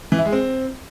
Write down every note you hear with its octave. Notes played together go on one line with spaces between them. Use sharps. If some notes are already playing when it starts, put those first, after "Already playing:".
E3
E4
G#3
C4